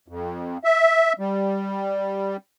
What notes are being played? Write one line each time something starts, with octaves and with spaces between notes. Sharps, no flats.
F2
E5
G3